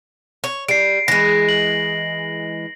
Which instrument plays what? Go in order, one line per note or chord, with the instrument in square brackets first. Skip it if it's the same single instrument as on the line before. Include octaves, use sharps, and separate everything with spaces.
[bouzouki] C#5
[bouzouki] G3 [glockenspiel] C7 D7
[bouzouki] E3 G#3 [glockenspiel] A#6
[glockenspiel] F#7